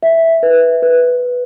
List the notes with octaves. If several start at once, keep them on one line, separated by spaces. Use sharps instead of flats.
E5
B4
B4